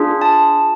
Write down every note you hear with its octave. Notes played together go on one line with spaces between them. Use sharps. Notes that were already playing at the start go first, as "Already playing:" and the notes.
Already playing: D4 F4 G#4
A5